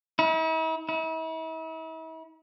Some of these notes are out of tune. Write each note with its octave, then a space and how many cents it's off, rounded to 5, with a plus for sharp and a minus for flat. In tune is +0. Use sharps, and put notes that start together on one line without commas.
E4 -45
E4 -40